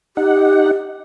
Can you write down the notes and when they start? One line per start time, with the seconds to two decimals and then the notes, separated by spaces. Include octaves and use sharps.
0.17 D#4 G4 F#5